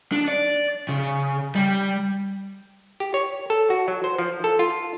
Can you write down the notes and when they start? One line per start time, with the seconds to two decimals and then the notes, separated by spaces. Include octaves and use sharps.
0.12 D4
0.28 D5
0.89 C#3
1.55 G3
3.00 G4
3.14 C#5
3.50 A4
3.70 F#4
3.88 F#3
4.04 C5
4.18 F3
4.44 A4
4.59 F4